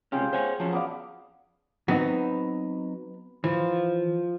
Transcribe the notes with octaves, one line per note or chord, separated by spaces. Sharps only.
C#2 C3 C#4 F4 G#4 G5
C5 C#5 F#5 G#5
F3 F#3 C#4 A5
B3 D5 F5
F#3 B3 C4 D#4
E3 F3